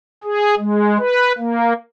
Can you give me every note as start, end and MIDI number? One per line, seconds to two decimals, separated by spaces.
0.24 0.55 68
0.58 0.98 56
0.99 1.33 71
1.38 1.73 58